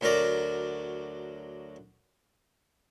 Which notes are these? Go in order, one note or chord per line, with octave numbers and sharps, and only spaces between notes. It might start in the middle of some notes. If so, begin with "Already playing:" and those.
D2 F#3 A#4 D5